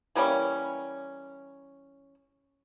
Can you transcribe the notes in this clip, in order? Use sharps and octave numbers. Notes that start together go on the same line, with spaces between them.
E3 G3 A#3 C#4